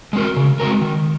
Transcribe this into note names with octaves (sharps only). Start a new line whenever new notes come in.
G#3 C4 F#4 A#4
C#3
G#3 C4 F#4 A#4
D#3